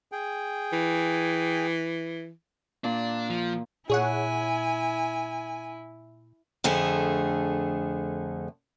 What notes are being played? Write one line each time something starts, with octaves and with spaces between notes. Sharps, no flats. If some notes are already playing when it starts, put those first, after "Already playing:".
G#4 G5
E3
A#2 D4
F3
A#2 E4 G#4 C#5 F#5 G#5
F2 D3 A3 G#4